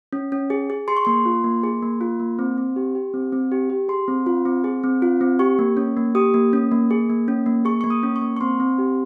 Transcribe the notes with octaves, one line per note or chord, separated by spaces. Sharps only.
C#4
C#4
G#4
G#4
G#4 C6
C#6
A#3 C6
F4
A#3
G#4
A#3
F4
A#3
C4
C4
G4
G4
C4
C4
G4
G4
G#4 C6
C4
F4
C4
G#4
C4
F4
C4
G4 C#6
A#3
C#4
A#3
G4 D#6
A#3
C#4
A#3
G#4
A#3
C#4
A#3
G#4 C#6
A#3 C#6
D#6
C#4
C#6
A#3
C#6
C4 C6
C4
G4